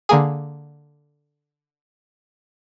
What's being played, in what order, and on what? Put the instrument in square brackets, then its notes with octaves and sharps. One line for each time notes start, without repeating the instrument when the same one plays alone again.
[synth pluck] D3 A#3 G#4